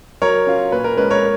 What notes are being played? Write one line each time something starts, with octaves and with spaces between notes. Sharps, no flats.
F#3 A#4 C#5
C#4 F4
A#2 B4
A#4
G#3 C#4 B4
A#4 C#5